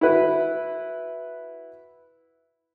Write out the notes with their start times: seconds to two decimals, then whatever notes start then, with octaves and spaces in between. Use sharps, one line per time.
0.01 E4 F#4 B4